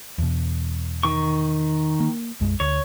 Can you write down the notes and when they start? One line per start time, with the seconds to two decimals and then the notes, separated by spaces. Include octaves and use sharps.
0.18 E2 B2
1.03 D#3 C#6
2.00 A#3
2.40 B1 F#2 G#3
2.60 D2 C#5